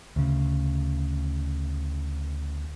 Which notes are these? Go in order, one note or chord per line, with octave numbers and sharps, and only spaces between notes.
D2 C#3